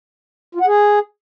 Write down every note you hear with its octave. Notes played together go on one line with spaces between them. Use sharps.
F4
F#5
G#4